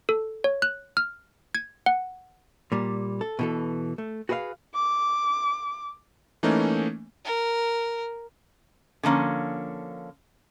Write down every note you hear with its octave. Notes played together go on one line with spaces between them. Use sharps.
A4
C#5
F#6
F6
G#6
F#5
A#2 G3
A4
B2 E3 A4
A3
F#4 G#4 B4 C5 F5
D6
E3 A3 A#3 C#4 D#4
A#4
D3 F3 A#3 C#4